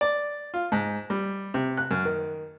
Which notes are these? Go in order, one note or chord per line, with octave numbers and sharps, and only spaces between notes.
D5
F4
G#2
G3
C3
F#6
F#2
D#3